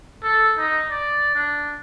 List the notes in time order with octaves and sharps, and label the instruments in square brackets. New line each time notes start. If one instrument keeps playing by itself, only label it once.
[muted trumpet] A4
D#4
D5
D4